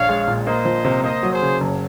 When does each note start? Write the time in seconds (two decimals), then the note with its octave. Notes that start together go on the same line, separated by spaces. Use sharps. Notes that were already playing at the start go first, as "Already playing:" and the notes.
Already playing: A#1 C#5 F5
0.09 G#3
0.28 A#2
0.46 A#3 C5 D#5
0.65 F3
0.85 C3
1.04 A#3 C5 D#5
1.23 F#3
1.32 G#4 C5
1.42 C#3
1.61 F#1